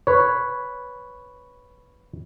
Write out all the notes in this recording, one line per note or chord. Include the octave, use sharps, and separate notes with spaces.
B4 C#5